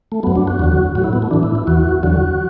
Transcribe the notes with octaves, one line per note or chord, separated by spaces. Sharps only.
A3
F#2 F#3 B3
D4
F#4
E2 D3 F#3
A2 F#3 F#4
E4
B3
A3
A2 E3 D4
E4
E4
E2 E3 F#4
E2 D3 F#3 F#4